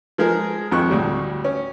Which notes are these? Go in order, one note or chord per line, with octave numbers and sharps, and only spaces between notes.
F3 G#3 G#4 A#4
G#1 F2 F3 C#6 F#6
D2 A2 G3
C#4